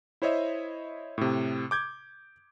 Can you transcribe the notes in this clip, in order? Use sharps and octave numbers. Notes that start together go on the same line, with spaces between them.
E4 C5 C#5 D#5 E5
A2 C3
D6 G6 G#6